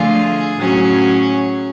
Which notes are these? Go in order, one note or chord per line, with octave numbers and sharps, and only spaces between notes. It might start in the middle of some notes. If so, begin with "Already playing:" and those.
Already playing: D3 F3 A3 F4 G#4
A2 F#3 C#4